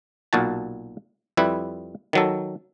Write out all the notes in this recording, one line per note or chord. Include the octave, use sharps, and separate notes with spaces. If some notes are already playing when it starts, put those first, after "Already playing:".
B1 A#2 F#4 A5
F2 G3 E4 B4
D#3 F#3 A4